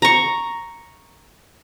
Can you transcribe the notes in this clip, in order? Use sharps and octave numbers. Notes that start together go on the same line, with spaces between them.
A#5 C#6